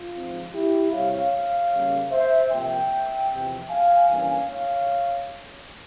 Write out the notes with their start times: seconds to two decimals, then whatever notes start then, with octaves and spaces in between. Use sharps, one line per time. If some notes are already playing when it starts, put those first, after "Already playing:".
Already playing: F4
0.13 G#2 F3 C4
0.53 E4 G4
0.93 C3 G3 C4 C#5 F5
1.33 C#5 F5
1.72 C#3 G3 A#3 C#4
2.11 C5 E5
2.51 C3 F3 A#3 E5 G5
3.30 E2 C3 F3
3.70 F5 G#5
4.09 G2 E3 A#3 C#4 F5 G#5
4.49 C#5 F5